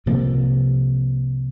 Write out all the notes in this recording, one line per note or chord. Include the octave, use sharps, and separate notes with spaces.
C2 C3 F3 A#3